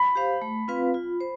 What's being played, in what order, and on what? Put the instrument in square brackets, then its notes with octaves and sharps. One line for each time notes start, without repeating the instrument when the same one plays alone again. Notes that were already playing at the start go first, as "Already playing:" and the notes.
Already playing: [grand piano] B5
[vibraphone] G4 C5 F5
A3
C4 F4 B4 F5
F4
C5